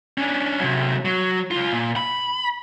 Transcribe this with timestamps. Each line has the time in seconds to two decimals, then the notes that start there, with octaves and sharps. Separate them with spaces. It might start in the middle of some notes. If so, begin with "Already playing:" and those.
0.18 C#4 D4
0.60 C3 F#3
1.05 F#3
1.51 C#2 F4
1.72 A#2
1.96 B5